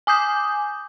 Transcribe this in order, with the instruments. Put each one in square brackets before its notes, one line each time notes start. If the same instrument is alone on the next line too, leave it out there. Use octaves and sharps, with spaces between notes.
[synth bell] G#5 D6 D#6 G6